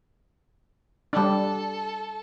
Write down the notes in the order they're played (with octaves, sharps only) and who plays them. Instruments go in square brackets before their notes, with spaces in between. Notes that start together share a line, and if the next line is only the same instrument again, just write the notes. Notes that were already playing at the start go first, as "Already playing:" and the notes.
[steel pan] G3 D4 [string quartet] A4